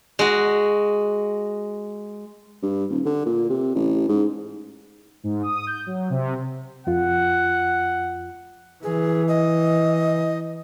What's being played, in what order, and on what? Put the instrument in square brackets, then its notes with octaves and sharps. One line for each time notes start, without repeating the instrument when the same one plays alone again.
[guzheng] G#3 F#4
[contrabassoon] G2
D#1
D3
A#2
C3
A1
G#2
[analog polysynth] G#2
D#6
G6
F#3
C3
[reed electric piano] F2 F4 [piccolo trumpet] F#5
[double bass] E3 [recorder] G#4
[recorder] D#5